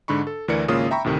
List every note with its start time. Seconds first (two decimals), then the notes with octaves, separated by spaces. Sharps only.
0.08 G#2 D3 D4 B5 C#6
0.27 A4
0.48 D2 E3 E4 A#4 D5 C#7
0.68 G#1 C#3 A#3 C#4 F4 D#6
0.91 E5 G5 A#5 B5 C#6
1.04 D2 A2 C3 D#3